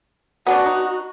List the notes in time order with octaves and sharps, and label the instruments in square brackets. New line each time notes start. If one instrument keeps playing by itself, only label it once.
[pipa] B3 C#4 D4 [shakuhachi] F#4
[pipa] D#4